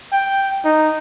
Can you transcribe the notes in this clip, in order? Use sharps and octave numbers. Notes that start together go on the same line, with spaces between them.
G5
D#4